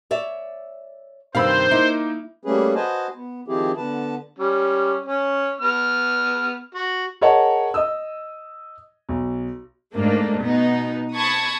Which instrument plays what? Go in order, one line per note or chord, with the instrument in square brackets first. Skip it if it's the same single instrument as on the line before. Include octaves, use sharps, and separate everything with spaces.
[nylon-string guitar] C#5 D5 E5
[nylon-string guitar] G2 C3 D#3 [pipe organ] C5 [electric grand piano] F5 B5 E6
[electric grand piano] A#3 D#4 [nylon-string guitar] E4
[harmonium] G3 A3 A#3 C#4 G#4 B4
F#4 B4 C5 D#5 G#5 A5
B3
D#3 F3 C4 E4 G4 G#4
D3 B3 B4 A5
[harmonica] G3 C#4
C#4
B3 F6
F#4
[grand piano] G#4 A#4 C#5 D#5 F#5 A5
D#5 D#6 E6
B1
[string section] G#2 A3 A#3 D4
B2 B3 D#4
A5 B5 C#6 D#6 G#6